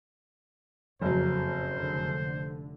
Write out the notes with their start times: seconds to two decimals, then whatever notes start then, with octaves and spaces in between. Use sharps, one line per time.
1.01 F#1 F2 C#3 F#3 C5
1.76 F1 D3